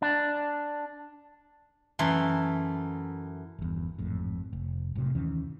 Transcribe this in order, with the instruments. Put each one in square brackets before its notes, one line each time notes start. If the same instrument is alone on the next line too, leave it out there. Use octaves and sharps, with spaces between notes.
[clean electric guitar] D4
[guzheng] F#2 E3 A3 C6
[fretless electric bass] G1 E2
G#1 F2 A2
F1
F1 F#2 A2 C3
D#2 D#3 E3 C#4